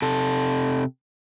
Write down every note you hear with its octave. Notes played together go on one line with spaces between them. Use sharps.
C3 A4